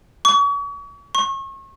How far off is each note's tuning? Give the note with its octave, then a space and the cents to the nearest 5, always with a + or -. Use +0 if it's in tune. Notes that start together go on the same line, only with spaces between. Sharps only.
C#6 +40
C#6 -35